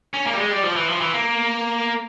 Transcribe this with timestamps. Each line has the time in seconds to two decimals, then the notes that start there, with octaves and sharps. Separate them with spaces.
0.14 C#4
0.27 A#3
0.33 G3
0.38 G#3
0.51 G3
0.64 F3
0.76 E3
0.88 F3
1.00 E3
1.13 A#3